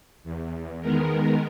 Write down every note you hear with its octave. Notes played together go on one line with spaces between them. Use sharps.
E2
D#3 G#3 B3 A#4